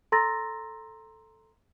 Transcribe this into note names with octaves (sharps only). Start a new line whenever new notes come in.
A4 A#5 C6 E6 A6 A#6